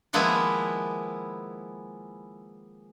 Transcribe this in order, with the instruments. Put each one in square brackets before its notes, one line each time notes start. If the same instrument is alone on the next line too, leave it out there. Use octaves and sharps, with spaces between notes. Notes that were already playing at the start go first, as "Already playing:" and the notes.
[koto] D#3 F3 G#3 A#3 B3 E4